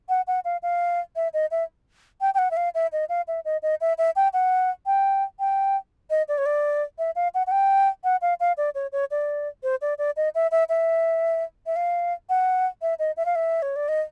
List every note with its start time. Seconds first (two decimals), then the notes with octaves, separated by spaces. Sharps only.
0.09 F#5
0.27 F#5
0.45 F5
0.63 F5
1.16 E5
1.34 D#5
1.51 E5
2.21 G5
2.34 G5
2.38 F#5
2.51 E5
2.57 F5
2.75 E5
2.92 D#5
3.09 F5
3.28 E5
3.45 D#5
3.63 D#5
3.81 E5
3.98 E5
4.16 G5
4.33 F#5
4.86 G5
5.40 G5
6.10 D#5
6.28 D5
6.38 C#5
6.46 D5
6.98 E5
7.16 F5
7.34 F#5
7.47 F#5
7.51 G5
8.04 F#5
8.22 F5
8.40 F5
8.57 D5
8.75 C#5
8.92 C#5
9.11 D5
9.63 C5
9.82 D5
9.98 D5
10.17 D#5
10.35 E5
10.51 E5
10.69 E5
11.66 E5
11.76 F5
12.29 F#5
12.82 E5
12.99 D#5
13.17 E5
13.26 F5
13.35 E5
13.62 C#5
13.76 D5
13.89 D#5